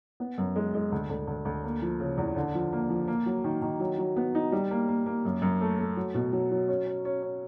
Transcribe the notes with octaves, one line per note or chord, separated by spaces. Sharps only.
B3
F#2
G#3
G#3
D2
D2
D2
D2
A#3
F3
C#3
E2
D3
F3
A#3
F3
A#3
F#3
D#3
D#3
F#3
F#3
B3
D#4
G3
A#3
A#3
A#3
F#2
F#2
A3
A3
F#3
B2
F#3
F#3
C#4
C#4
C#4
C#4